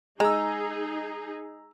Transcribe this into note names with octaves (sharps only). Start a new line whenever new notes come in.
G#3 D#4 G#4 A#5 E6